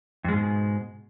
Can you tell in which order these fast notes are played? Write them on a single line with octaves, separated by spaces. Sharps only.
F2 G#3 G#2 B2